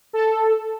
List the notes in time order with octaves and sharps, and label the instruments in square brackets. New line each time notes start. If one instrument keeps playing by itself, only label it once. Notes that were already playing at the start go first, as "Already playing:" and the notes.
[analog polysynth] A4